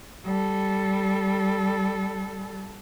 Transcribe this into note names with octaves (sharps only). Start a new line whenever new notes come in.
G3 A4